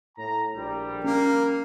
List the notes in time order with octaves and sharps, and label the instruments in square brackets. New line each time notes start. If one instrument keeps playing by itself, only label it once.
[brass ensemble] A2 A#5
A#1 G3
[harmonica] A#3 [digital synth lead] C#4